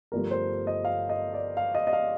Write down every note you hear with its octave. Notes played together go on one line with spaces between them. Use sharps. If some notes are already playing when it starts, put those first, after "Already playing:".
G1 G2 F3 A3 A#4
C5
D#5
F5
D#5
D5
F5
D#5
D#5
F5